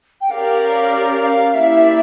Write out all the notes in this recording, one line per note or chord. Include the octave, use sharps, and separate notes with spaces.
G5
C#4 G4 A#4 D5 F5
F5
F5
A#3 E4 G4 D5 E5